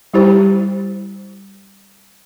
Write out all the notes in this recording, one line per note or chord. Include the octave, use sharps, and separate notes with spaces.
G3 E4 G4 C5